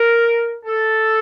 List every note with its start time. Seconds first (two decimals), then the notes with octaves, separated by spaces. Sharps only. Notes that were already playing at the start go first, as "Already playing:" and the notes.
Already playing: A#4
0.65 A4